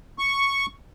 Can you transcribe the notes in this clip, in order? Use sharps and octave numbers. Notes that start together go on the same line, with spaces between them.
C#6